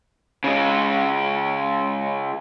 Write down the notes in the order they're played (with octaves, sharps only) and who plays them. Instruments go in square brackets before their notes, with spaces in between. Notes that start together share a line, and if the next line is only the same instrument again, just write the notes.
[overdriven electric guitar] C#3 G#3